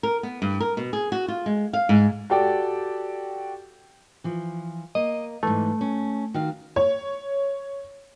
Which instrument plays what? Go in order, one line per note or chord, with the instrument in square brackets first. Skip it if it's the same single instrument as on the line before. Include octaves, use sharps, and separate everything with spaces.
[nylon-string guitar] A#4
B3
G2
A#4
B2
G#4
F#4
F4
G#3
F5
G#2
[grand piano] F#4 G4 A4 D5 G5
[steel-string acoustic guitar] E3 F3
[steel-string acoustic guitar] A#3 [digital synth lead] D#5
[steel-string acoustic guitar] G#2 E3 [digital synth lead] A3
[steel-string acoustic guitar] C#4
D#3 F#4 F5
[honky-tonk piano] C#5